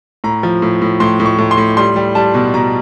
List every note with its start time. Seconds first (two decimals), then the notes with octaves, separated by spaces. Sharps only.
0.24 A2 A#5
0.43 F3
0.62 A2
0.82 A2
1.00 A2 C6
1.20 A2
1.26 C#6
1.38 A2
1.51 C6
1.58 A2
1.77 G3 C6
1.96 G3
2.15 G3 A5
2.34 B2
2.54 B2 A#5